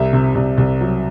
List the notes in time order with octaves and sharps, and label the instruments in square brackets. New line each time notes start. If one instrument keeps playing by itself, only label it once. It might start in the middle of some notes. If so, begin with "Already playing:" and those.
Already playing: [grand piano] C2 E5
C3
C2
C2
F#3